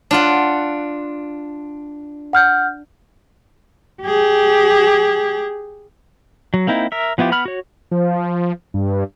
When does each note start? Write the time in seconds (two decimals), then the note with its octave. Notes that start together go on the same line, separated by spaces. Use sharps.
0.11 D4 F4 F#5
2.33 F#5 F6 G6
4.02 G4 G#4
6.54 F#3
6.67 A#3 C4 D#4 E4
6.92 A#4 E5
7.18 F3 B3 E4 F4 G4
7.32 B3 B5 F6
7.45 F#4 C#5
7.91 F3
8.74 G2